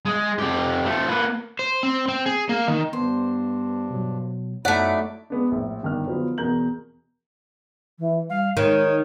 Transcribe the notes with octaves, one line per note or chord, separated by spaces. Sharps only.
G#3
F2 G4
F3 A3
A#3 B4
C5
C4
C4
G#4
A#3
D#3
G2 B3 D4 C5
B2 F#3
F#2 F#3 A3 D#4 E4 D5 F#5 B6
G#3 B3 D4
A#1 A2
G1 D#3 D4 F6
D3 F3 F#3 B3
E2 B2 A#4 A#5 G6 F#7
E3
G3 F5
D#3 G#3 C#5